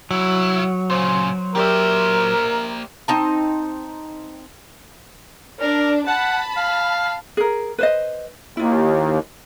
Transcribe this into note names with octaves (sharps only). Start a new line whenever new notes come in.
C2 F#3 E4
A#2 C#3 C5
A#3 G4 A#4 C5 D5 E5
C4 D#4 A5
D4 A#4
F#5 A5 B5
F5
G#4 A#4
B4 C5 D#5
D#2 E4 F4